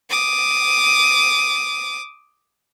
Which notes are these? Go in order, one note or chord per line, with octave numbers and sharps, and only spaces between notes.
D6 D#6